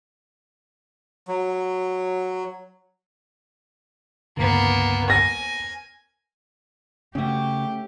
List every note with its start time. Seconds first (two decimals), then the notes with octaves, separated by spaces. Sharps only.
1.28 F#3
4.37 C#2 G2 D3 A#3 B3
5.10 G#5 A#6
7.15 C#3 A3 C#4 F#4 G4